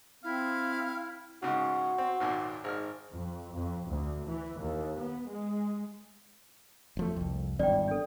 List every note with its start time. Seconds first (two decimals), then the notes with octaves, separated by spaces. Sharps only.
0.24 C4 E4 F5
1.42 G#2 C#3 G#3 F#4
1.98 C4
2.20 G#1 D#2 A#2
2.64 G#1 G#2 F6
3.11 F2
3.53 F2
3.88 D2
4.26 E3
4.59 D#2
4.98 B3
5.28 G#3
6.97 E1 F3 A3
7.16 C2 F2
7.59 G#1 E2 G2 D5 G5
7.88 D4 A4